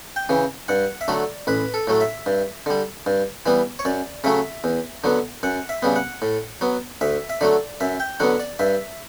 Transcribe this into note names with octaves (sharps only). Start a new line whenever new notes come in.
G5
C#3 E3
G2 F#5
E5
D3 F#3 A3 D5
A1 B4
A4
A2 F#3 A3
E5
G2
D3 G3
G2
E3 G3 B3
C#5
F#2 D5
C#3 F#3 A3 E5
E2
D3 F#3 B3
F#2 F#5
E5
C#3 G3 B3
F#5
A2
F#3 B3
D2 E5
E5
D3 F#3 A3 D5
F#2 E5
G5
D3 F#3 B3 F#5
D5
G2 E5